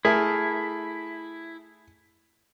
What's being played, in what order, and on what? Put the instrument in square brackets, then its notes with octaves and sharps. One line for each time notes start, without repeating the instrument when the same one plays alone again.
[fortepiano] A3 G#4 A#4 [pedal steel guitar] E4